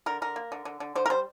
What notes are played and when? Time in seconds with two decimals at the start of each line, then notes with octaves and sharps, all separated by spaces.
0.06 D3 A#4
0.22 D3 A#4
0.36 A#3
0.52 D3
0.65 D3
0.80 D3
0.95 D3 C5
1.06 A#4
1.10 G3 C5